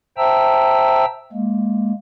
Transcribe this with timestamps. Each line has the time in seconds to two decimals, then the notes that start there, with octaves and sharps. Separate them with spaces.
0.17 C5 E5 G5 A5 A#5 E6
1.32 G#3 A#3